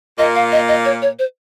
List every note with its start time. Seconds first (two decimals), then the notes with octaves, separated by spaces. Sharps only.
0.18 A#2 A#3 D#5
0.35 F5
0.52 D#5
0.68 D#5
0.85 C#5
1.02 C#5
1.19 C5